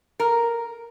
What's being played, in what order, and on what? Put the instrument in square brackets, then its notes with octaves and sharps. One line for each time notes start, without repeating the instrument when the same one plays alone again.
[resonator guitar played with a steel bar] A#4